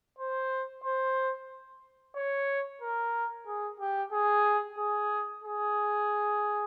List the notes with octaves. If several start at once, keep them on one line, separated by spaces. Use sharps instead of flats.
C5
C5
C#5
A#4
G#4
G4
G#4
G#4
G#4